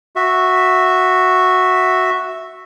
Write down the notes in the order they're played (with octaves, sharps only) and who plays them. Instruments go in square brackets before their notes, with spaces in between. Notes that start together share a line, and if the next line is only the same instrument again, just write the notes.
[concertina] F#4 E5